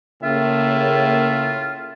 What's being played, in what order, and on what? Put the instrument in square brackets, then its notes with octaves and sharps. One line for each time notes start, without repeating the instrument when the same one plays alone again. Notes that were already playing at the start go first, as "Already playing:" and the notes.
[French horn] A2 [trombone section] C#3 A#3 [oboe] F4 [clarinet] E5